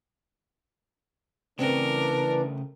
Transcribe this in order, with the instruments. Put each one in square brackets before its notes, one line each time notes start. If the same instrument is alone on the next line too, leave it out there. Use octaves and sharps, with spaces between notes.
[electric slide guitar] C#3 A3 [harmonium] E3 D4 D5 [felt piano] C4 [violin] A#4